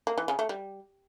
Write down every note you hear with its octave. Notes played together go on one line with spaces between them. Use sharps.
A#3
E3
C#3
A3
G3